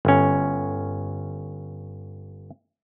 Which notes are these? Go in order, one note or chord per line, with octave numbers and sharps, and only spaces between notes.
G1 C#4